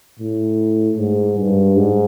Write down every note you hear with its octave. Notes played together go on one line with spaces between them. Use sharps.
A2
G#2
G2
G#2